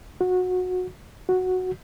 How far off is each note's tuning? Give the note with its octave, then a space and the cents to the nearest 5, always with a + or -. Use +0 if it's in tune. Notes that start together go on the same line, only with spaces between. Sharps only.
F#4 -20
F#4 -5